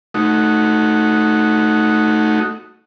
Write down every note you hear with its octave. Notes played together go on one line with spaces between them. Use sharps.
A3 D#4 F#4